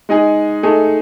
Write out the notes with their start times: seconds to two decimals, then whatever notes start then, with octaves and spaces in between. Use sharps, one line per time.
0.09 G#3 D#4 G#4
0.63 A3 D#4 G#4